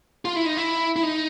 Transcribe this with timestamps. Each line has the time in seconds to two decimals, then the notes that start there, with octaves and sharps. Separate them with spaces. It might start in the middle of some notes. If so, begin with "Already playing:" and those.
0.25 F4
0.36 E4
0.46 D#4
0.57 E4
0.96 E4
1.03 D#4